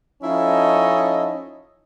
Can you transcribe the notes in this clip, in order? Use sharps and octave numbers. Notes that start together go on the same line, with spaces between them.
F3 C#4 D#4 E4 A4 D#5